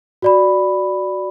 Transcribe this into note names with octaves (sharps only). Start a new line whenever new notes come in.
F#4 D5 B5